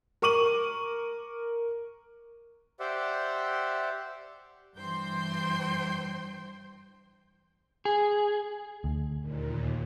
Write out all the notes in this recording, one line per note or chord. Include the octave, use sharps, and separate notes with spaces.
A#4 C#6 D6 D#7 F#7
G4 C5 D5 E5 F#5
G2 E3 C5 G5 C6 G6
G#4
D2
D#2 A#2